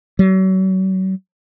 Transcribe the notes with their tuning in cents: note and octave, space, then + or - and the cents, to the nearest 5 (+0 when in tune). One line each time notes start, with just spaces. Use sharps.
F#3 +35